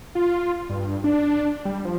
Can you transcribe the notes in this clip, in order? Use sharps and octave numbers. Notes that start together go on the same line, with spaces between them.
F4
G2
D4
G3
F3